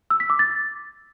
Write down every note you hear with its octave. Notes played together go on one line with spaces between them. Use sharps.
E6
B6
D6
A6